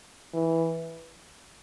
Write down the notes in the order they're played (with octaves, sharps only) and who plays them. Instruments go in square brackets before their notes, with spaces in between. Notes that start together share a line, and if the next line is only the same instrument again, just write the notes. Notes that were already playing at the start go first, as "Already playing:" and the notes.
[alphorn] E3